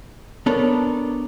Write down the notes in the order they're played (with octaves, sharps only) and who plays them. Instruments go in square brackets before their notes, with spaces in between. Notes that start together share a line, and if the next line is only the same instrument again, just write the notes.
[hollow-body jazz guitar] B3 D4 A4 A#4 C#5